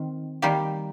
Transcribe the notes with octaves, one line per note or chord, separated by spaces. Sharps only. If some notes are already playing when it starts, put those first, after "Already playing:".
Already playing: D#3 C4
D#3 G3 A#3 G4